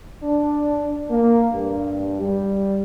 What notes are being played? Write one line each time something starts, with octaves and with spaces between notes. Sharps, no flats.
D4
A#3
G2
G3